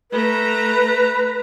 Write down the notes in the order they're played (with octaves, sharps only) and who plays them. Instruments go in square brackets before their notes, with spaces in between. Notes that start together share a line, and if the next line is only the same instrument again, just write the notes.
[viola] A3 A#5 [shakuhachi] B4